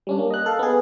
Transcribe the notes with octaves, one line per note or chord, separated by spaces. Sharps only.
G3 C#4 D4
A#3
D#5 F#6
A4 F5
B3 G#4